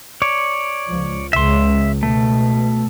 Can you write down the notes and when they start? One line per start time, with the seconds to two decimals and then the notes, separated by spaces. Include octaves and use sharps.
0.22 C#5 D5
0.86 C#2 F3
1.33 C#2 E5 C6
2.03 B2 A3